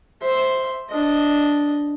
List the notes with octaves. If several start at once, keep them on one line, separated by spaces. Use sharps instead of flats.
C5 E5
D4 D#5